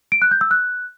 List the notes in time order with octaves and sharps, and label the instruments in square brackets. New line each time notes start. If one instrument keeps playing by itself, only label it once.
[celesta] D7
F#6
G6
E6
F#6